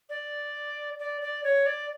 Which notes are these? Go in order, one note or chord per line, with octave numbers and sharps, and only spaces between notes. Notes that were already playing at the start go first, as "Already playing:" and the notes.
D5
D5
D5
C#5
D5